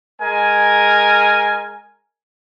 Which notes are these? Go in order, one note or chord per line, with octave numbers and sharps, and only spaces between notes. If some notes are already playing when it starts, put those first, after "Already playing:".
G#3 A#4 G#5